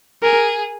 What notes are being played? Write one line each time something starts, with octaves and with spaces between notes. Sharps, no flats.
G#4 A#4